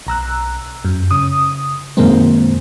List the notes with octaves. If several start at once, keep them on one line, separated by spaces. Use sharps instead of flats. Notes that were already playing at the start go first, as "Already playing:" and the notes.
B1 A#5 E6 F#6
F#2
C#3 D#6
F#2 B2 D#3 G#3 A#3 C4